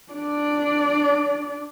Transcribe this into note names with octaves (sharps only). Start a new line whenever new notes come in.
D4 D5